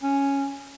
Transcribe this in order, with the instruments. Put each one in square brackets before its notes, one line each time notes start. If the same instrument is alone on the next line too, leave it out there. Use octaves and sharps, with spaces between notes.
[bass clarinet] C#4